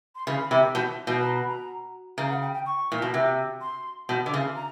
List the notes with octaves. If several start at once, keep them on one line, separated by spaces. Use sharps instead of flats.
C6
C#3 B5
C3
B2
B2
A#5
B5
A#5
C#3 A#5
F5
F#5
G5
G5
C#6
A#2
B2
C3
C6
B2
D3
C#3
A#5